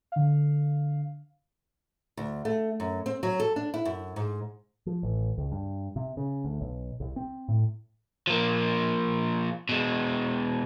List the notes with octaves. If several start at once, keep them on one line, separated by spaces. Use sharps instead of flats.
D3 F5
D2
A3
F#2
C4
F#3
A4
D4
E4
F#2
G#2
F3
A1
C#2
G2
C3
C#3
D2
B1
C2
C4
A2
F3 A#3
B2 G#3